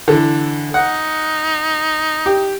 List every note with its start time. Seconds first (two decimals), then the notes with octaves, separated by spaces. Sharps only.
0.08 D3 E3
0.74 D#4 F#5
2.26 G4